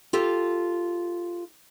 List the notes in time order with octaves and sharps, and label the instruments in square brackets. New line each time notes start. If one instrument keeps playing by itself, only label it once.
[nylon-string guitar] F4 G4 A4